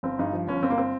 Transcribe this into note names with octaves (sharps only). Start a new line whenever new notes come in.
G1 C4
G2 D#4
F3
G1 C#4
G1 C4
A#3
C4